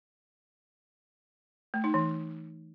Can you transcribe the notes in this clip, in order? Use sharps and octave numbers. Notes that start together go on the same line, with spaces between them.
A3
D#4
E3